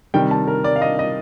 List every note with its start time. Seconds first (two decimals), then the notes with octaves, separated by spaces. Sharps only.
0.14 C3 D#3 G3 G5
0.31 A5
0.47 A#4
0.64 D5
0.76 F5
0.82 D#5
0.99 D#5